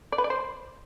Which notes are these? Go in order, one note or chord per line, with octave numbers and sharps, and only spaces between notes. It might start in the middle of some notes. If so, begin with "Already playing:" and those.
D5
B4
D5
C5